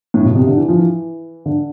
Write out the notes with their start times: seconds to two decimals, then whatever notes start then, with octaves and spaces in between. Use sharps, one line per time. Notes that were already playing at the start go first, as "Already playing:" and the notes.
0.14 A2
0.25 B2
0.36 C3
0.47 D3
0.57 E3
0.68 F3
0.79 E3
1.46 D3